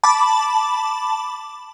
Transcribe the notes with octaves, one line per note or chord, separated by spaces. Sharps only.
A5 B5 D6